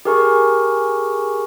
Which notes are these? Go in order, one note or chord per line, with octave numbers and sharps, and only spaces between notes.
G4 G#4 A#4 G#5 C#6